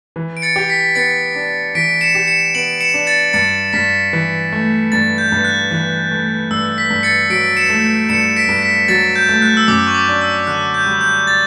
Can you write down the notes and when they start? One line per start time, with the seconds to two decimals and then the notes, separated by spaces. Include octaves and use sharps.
0.16 E3
0.37 D7
0.42 A6 C#7
0.56 G4
0.70 B6
0.95 B3 A6 C#7
1.35 D4
1.75 E3 B6 D7
2.01 C#7 E7
2.15 G4
2.27 C#7 E7
2.55 B3 D7 F#7
2.81 C#7 E7
2.94 D4
3.07 A6 C#7
3.33 G2 A6 C#7
3.73 G2 B6
4.13 E3
4.52 A3
4.92 G2 A6
5.18 G6
5.32 G2
5.45 F#6
5.71 E3
6.11 A3
6.51 G2 E6
6.78 B6
6.90 G2
7.03 A6 C#7
7.30 F#3 B6 D7
7.57 C#7 E7
7.70 A3
8.09 G2 C#7 E7
8.37 B6 D7
8.49 G2
8.62 B6
8.88 F#3 A6
9.16 G6
9.29 A3
9.42 F#6
9.57 E6
9.68 F#2 D6
9.87 C#6
9.95 D6
10.08 D4
10.21 E6
10.47 D3 F#6
10.74 G6
10.87 G3
11.01 G6
11.27 A6